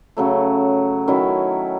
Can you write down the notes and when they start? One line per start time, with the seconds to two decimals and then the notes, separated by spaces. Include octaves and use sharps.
0.17 C#3 F#3 A3
1.08 D#3 F#3 C#4 E4